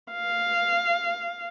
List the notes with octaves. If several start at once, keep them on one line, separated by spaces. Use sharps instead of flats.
F5